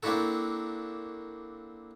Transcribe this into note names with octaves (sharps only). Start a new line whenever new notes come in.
A#3 C4 D4 E4 F#4 A4